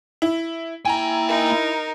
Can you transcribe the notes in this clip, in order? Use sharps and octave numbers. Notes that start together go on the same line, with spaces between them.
E4
A#3 E4 G5 G#5 A#5
D#4 A#4